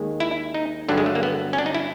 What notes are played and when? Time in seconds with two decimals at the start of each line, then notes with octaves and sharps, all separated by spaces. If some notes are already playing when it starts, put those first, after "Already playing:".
Already playing: D#2 D#3 G#3
0.20 E4
0.54 D#4
0.88 G2 D3 F#3 D4
0.98 G#3
1.06 A3
1.15 A#3
1.23 B3
1.53 C#4
1.58 D4
1.66 D#4
1.74 E4